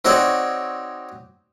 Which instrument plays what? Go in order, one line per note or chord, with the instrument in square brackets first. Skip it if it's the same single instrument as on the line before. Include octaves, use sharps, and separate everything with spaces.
[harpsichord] C4 D#4 F#4 C#5 D5